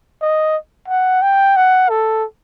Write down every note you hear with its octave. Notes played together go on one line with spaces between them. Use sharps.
D#5
F#5
G5
F#5
A4